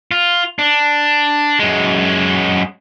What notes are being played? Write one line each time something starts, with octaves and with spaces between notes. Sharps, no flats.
F4
D4
F#2 G#3